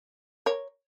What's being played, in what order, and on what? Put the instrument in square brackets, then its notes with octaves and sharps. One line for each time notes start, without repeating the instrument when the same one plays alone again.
[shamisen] A#4 C#5